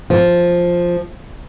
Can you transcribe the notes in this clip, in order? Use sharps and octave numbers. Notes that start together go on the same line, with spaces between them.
F3